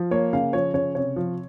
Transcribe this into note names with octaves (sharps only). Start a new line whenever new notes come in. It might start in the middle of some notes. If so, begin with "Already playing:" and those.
Already playing: F3
A#3 C#5
C#3 F5
F3 C#5
C#3 C#5
C3 C#5
F3